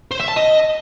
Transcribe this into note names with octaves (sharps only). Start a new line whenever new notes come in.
C5
E5
A5
D#5